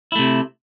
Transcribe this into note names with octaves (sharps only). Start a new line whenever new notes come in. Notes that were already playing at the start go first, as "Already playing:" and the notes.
C3 A3 E4